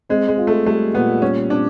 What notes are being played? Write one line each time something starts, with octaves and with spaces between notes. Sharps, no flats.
G#3 C4
G#3
F4
A3
G3 A3
A#2 B3
G3 C#4
C4 D4